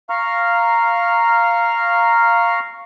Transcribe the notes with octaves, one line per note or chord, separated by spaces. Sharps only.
F5 A#5 C#6 F6